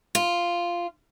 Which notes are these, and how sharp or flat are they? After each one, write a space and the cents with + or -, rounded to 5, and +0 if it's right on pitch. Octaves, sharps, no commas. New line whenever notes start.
F4 -5